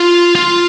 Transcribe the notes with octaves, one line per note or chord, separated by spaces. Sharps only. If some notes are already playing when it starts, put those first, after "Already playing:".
Already playing: F4
F4